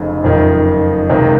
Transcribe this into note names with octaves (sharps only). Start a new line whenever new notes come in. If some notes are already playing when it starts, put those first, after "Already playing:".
Already playing: F1 F2 C#3
F#1 F2 D#3
C#2 C3 D#3